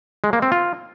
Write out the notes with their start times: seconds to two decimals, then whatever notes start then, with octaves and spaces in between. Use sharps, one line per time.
0.24 G#3
0.33 A#3
0.42 C4
0.52 F4